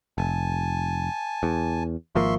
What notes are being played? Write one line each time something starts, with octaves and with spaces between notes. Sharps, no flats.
F1 G#5 A5
E2
G#1 F3 A#3 E5 C6 C#6